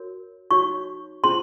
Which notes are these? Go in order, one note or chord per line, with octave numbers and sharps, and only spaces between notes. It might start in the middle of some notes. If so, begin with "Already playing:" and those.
Already playing: F#4 A#4 C#5
D#4 F#4 C#5 C#6
C#4 F4 G#4 C5 C6